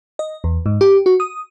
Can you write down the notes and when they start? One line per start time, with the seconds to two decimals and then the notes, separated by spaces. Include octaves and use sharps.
0.19 D#5
0.44 E2
0.66 G#2
0.81 G4
1.06 F#4
1.20 D#6